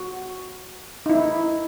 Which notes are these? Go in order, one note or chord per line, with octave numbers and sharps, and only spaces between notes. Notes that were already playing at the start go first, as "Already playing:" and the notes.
Already playing: F#4
D#4
E4